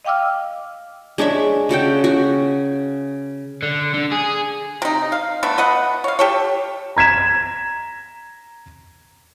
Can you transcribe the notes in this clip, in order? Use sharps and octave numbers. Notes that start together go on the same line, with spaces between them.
D#5 F5 G5 D6 E6 F6
G#3 D4 C#5 E5
C#3 F#4 A4 G5
F#4
D3
D3
G#4
C3 D#4
F5
A3 B3 D4
B4 D#5 F#5
C#5 F5
G4 A4 C#5
A#5 G#6 B6 E7